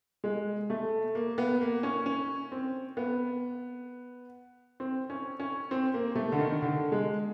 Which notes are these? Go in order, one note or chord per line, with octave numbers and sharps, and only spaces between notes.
G#3
A3
A#3
B3
A#3
C#4
C#4
C4
B3
C4
C#4
C#4
C4
A#3
A3
D3
D#3
D3
G#3